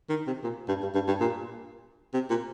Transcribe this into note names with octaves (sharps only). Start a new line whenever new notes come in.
D#3
C3
A#2
G2
G2
G2
G2
A#2
C3
A#2